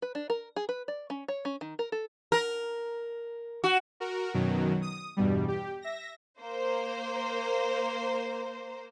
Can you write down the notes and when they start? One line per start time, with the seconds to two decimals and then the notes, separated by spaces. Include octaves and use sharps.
0.02 B4
0.15 D4
0.30 A#4
0.56 G#4
0.69 B4
0.88 D5
1.10 C#4
1.28 C#5
1.45 C#4
1.61 D#3
1.79 A#4
1.92 A4
2.32 A#4
3.64 F#4
4.00 F#4 A#4
4.34 F#2 B2 D#3 F#3
4.82 D#6
5.17 E2 G2 B2 G3
5.48 G4
5.82 E5 A#6
6.41 A#3 C5